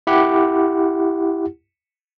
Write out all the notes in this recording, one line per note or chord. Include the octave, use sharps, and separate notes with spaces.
E4 G4 F#5